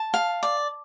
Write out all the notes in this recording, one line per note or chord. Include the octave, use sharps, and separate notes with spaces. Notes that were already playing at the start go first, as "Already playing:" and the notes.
Already playing: A5
F5
D5